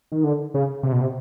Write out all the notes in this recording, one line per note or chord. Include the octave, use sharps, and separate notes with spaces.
D#3
D3
C#3
C3
B2
C3